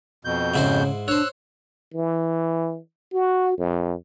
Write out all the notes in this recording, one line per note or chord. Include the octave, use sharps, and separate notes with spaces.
F2 B2 G6
G#2 C#3 E4 C5
D4 C5 C#5 E6 F#6
E3
F#4
F2